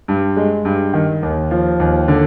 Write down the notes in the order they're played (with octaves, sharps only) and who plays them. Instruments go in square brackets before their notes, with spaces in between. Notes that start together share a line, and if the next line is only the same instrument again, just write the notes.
[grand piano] G2
G#3
G2
D#3
D#2
F3
D#2
D3